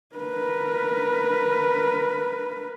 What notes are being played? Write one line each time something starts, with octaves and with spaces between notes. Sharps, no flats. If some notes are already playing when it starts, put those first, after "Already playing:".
A#4 B4